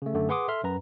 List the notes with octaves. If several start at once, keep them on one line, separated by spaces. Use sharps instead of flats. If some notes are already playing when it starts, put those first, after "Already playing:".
C#3 A3
F#2 D3 A3
G#4 B4 F#5 C6 D6 D#6
A4 E5 C6 F6
F#2 B4 A#5